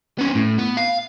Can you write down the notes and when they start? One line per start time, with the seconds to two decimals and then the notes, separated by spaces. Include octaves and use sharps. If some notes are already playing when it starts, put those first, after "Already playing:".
0.18 B3 C#4
0.35 A2
0.58 B3
0.77 F5